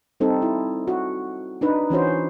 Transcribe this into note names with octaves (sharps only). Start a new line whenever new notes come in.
G3 C4 D#4 A4
E4
F#4
D4 D#4 B4
E3 C#4 F#4 C5